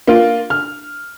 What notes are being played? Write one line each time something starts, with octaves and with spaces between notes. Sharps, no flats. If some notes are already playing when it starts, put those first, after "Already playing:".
A#3 F4
F6